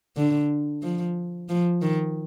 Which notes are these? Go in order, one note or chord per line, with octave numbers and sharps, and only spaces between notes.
D3
F3
F3
D#3